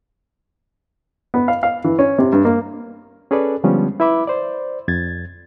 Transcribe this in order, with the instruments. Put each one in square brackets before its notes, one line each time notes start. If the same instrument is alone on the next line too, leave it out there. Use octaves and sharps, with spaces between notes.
[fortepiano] B3
F5
F5
E3
C#4
C3
G2
A#3
[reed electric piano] C#4 G#4 A4 B4 D5
D3 F3 G3 G#3 B3 C#4
E4 B4 E5 B5 D6
C5 D5
F2 G#6 A6